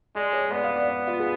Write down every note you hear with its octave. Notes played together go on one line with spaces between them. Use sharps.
G#3 D5
C#5
B3 D5
F5
D5
D5
F4
G#4